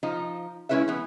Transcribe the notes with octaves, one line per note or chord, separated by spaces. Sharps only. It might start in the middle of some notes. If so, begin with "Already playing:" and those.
F3 D#4
G#3 C#4 E4 B4 C#5 E5
E3 B3